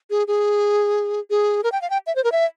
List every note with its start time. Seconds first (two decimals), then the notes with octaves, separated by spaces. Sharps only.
0.10 G#4
0.27 G#4
1.30 G#4
1.64 A#4
1.72 G5
1.82 F5
1.90 G5
2.07 E5
2.16 C5
2.24 A#4
2.32 E5